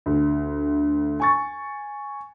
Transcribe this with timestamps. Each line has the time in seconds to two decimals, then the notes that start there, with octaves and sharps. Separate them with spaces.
0.06 D2
1.20 G#5 C#6 A6